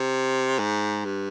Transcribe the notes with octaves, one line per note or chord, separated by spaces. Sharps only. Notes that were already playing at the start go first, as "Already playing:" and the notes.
Already playing: C3
G#2
G2